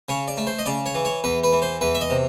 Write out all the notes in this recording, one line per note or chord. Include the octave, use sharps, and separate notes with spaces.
C#3 C#5
D5
A3
C5
D#5
C#3 D5
C#5
E3
C#5
E2 B4
B4
E3
C5
E2 B4
E5
D#5
C3